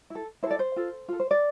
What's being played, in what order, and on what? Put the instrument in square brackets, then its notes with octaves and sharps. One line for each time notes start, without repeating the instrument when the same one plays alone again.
[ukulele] E4 A4
E4 C5
A4 D5
C5
F4 A4
F4 A4
C5
D5